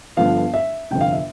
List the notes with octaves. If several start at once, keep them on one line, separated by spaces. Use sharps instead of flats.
G1 G2 D3 F3 B3 F5
E5
G1 F2 C3 G5
F5
E5